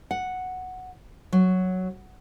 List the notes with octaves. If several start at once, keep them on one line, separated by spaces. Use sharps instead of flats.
F#5
F#3